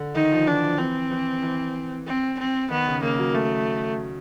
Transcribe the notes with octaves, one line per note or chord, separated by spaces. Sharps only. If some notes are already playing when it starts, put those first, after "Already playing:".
Already playing: D3
D#3 D#4
F3
E3 D4
F3
E3 C4
E3
E3
C4
C4
D#3 B3
C#3
C#3 A#3
F#3
A3